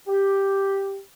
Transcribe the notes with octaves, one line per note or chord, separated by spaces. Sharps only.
G4